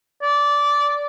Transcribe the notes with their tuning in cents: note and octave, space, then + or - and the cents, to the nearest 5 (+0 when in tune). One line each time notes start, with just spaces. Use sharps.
D5 -15